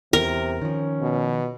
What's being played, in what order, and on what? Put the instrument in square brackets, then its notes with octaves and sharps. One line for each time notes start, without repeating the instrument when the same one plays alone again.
[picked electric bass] E2 [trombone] C3 [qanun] A#4
[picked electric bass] D#3 F3 [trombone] C#4
[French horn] B2